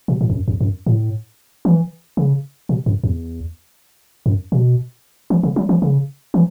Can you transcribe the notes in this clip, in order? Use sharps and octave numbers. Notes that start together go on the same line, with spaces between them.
B2
A2
E2
F#2
E2
F#2
A2
E3
C#3
B2
F#2
E2
F#2
B2
E3
C#3
F#3
E3
C#3
E3